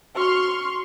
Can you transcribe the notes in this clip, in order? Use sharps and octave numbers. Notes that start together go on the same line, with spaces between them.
F#4 C6 C#6 F6